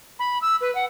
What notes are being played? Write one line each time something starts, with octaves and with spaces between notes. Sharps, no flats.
B5
E6
B4
F#5